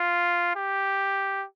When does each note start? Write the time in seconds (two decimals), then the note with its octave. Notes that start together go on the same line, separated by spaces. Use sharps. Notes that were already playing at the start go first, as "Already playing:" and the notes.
Already playing: F4
0.56 G4